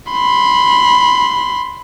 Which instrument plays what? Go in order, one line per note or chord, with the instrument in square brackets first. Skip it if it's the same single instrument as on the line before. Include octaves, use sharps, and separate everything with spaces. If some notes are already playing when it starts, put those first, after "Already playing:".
[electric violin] B5 C6